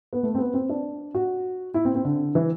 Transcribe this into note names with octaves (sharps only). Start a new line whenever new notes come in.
B3
A3
C4
B3
C4
D4
F#4
E4
C4
C4
D3
E3